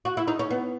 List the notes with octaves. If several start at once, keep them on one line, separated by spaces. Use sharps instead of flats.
F#4
E4
D#4
C#4
B3